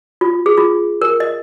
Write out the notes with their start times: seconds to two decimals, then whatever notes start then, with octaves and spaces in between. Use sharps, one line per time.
0.21 F4
0.46 G#4
0.57 F4
1.02 A#4
1.20 D#5